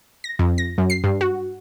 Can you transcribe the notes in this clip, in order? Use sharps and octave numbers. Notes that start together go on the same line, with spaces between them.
A#6
F2
A#6
F#2
C7
G2
F#4